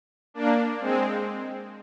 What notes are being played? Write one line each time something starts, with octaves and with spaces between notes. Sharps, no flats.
A#3 D4
G#3 C4